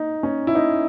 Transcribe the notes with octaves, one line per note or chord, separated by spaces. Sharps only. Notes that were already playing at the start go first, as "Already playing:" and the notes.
Already playing: D#4
C#4
E4
D#4